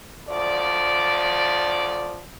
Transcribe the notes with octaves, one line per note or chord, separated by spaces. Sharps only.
D2 F3 D5